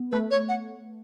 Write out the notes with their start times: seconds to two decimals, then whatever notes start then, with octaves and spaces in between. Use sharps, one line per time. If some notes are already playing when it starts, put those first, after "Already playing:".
Already playing: B3
0.12 A3 B4
0.31 C#5
0.49 F#5